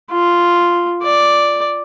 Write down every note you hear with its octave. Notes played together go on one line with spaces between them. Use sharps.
F4
D5